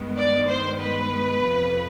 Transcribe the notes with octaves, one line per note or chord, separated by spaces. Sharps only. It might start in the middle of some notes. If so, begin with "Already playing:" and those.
Already playing: G2 D#3 G#3 B3
D5
C5
B4
F2 C3 F3